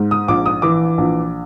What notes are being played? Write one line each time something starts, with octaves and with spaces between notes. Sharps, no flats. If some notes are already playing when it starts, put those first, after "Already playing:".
Already playing: G#2
D#6
A#1 D6
D#6
E3 D6
A#1